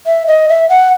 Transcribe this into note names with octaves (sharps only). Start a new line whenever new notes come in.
E5
D#5
E5
F#5